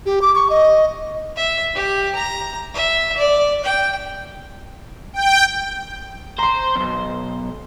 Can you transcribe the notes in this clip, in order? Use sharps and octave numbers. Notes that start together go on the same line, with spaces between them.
G4
D6
C#6
D#5
E5
G4
A#5
E5
D5
G5
G5
C5 A#5 C6
B1 E2